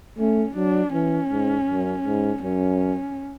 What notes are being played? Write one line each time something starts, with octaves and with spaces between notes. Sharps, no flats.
A3 C#4
F#3 D4
E3 C#4
G#2
F#2
G#2
F#2 C#4